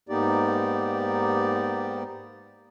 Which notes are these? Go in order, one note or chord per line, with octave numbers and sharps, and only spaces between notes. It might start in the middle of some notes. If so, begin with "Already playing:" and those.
G#2 A#3 B3 D#4 G4 D5